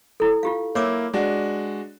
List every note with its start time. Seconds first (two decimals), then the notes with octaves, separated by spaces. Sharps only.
0.20 E4 A4
0.43 F4 G4 F5
0.75 A#3 E4 C#5 D6 E6
1.14 G#3 D4 F#4